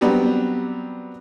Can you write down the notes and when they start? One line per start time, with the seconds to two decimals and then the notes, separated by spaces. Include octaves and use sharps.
0.01 F#3 G3 B3 C4 D4 G4